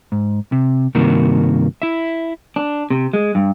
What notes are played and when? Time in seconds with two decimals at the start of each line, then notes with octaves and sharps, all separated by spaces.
0.12 G#2
0.52 C3
0.95 G2 C3 D#3 A#3 F#4
1.82 E4 E5
2.56 D4
2.90 C3
3.13 G#3
3.35 G2